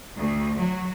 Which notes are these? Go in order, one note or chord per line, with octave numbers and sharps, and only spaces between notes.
D2
F#3